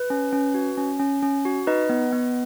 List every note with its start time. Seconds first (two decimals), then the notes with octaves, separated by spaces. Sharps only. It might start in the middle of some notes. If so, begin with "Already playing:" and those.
Already playing: B4
0.10 C#4
0.33 C#4
0.54 F#4
0.77 C#4
1.00 C#4
1.23 C#4
1.45 F#4
1.67 D#4 B4 D#5
1.89 B3
2.12 B3